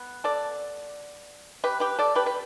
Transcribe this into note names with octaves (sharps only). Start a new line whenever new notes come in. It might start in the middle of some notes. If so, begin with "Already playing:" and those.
Already playing: B3
A4 D5
G4 B4
G4 B4
A4 D5
G4 B4
B4